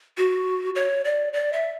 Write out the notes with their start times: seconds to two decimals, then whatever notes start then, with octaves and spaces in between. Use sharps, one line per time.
0.18 F#4
0.75 C#5
1.05 D5
1.33 D5
1.53 E5